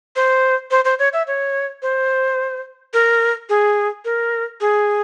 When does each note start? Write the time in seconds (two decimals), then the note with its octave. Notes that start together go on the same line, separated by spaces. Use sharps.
0.16 C5
0.71 C5
0.85 C5
0.99 C#5
1.13 E5
1.27 C#5
1.82 C5
2.93 A#4
3.49 G#4
4.05 A#4
4.61 G#4